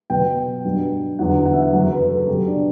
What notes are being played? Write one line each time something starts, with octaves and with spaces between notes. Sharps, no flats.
B2 F#3 G5
G2 F#3
E2 D3 F#3 F#5
F#5
E5
F#5
F#2 C#3 F#3
B4
A4
B2 F#3 G4
D4